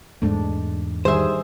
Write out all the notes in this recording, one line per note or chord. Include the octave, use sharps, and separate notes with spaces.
E2 G#2 G#3 A3 D4
D#3 G3 G#4 C5 E5